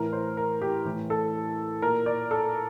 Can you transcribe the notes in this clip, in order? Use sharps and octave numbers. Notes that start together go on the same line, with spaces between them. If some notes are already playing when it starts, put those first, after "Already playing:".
Already playing: A2 E3 A#4
C5
A#4
G4
A2 E3
A4
A#2 A#4
D5
A4